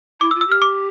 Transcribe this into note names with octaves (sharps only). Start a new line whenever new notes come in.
E4 D6
E6
F4
E6
G4 F6
D6